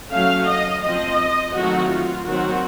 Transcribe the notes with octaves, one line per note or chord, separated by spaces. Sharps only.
F#3 A3 C#4 F5
D#5
F3 C4 D#5
D#3 F#3 A3 C4 F#4
F4
D#3 F#3 C4 F#4